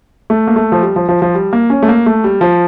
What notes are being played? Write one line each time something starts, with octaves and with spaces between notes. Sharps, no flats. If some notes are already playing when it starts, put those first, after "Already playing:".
A3
A#3
A3
F3
G3
F3
F3
F3
G3
A#3
C#4
A3
A#3
A3
G3
F3